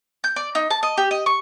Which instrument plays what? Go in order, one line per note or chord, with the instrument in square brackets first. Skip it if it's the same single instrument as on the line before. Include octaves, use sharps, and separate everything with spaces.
[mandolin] G6
D5
D#4
A5
D#5
G4
D#5
C#6